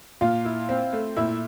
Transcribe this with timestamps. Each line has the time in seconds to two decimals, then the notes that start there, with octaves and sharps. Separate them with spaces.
0.21 A#2 F4 F5
0.45 E4
0.69 C4
0.93 A3
1.16 A#2 E4 E5